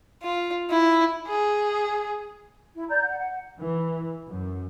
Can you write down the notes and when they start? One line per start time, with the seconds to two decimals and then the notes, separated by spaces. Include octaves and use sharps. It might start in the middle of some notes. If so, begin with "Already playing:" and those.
0.22 F4
0.70 E4
1.28 G#4
2.76 E4
2.89 D5 A#5 G6
3.04 F#5
3.18 F#5
3.58 E3
4.27 F#2